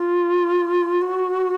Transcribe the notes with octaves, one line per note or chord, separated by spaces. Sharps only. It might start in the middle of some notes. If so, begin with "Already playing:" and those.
Already playing: F4
F#4